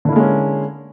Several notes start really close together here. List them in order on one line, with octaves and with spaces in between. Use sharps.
D3 E4 A#3 G#3 C#4